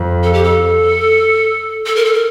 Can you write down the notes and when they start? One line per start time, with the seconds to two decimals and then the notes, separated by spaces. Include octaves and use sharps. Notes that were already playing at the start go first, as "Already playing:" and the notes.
Already playing: F2
0.23 A4
0.33 G4
0.43 A4
1.86 A4
1.95 A#4
2.04 A4
2.13 A#4